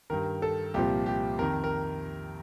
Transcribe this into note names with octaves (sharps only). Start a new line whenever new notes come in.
G2 D#3 A#4
A4
C2 A#2 F3 G4
G4
F2 D#3 A#4
A#4